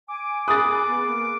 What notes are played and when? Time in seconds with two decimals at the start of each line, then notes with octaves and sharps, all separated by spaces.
0.08 G#5 D6
0.48 G#4 B5 D#6 F#6 A6
0.87 B3
1.06 A#3